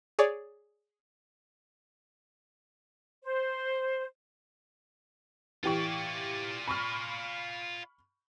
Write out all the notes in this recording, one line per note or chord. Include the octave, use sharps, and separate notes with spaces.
G#4 C#5 D5
C5
E3 F4 G4 D5 C#6
B5 C#6 F6